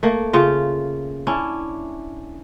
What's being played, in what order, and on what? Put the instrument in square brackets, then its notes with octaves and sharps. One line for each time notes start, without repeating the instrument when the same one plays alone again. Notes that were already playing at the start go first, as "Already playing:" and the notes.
[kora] A3 A#3
C#3 F4
C#4 D4 E4